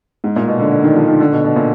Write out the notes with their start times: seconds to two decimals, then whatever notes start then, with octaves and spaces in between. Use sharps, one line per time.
0.24 G#2
0.36 A#2
0.48 B2
0.60 D3
0.72 D3
0.84 D#3
0.96 F3
1.08 D#3
1.20 D3
1.32 B2
1.44 B2
1.56 A#2